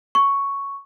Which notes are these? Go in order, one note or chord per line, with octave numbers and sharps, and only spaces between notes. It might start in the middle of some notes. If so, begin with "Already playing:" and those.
C#6